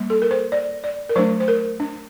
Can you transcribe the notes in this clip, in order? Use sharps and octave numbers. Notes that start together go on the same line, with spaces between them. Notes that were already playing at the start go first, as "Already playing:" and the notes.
Already playing: G3 A#3
A4
A#4
C5
D5
D5
A#4
F#3 A3 D4 C5
C5
A#4
D4